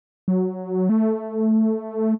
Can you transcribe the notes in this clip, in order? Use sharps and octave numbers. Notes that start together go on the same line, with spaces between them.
F#3
A3